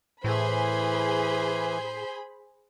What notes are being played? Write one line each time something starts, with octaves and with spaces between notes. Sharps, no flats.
A2 E3 G#4 C5 B5